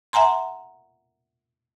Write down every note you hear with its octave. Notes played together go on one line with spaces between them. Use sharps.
E5 F#5 G#5 A#5 C6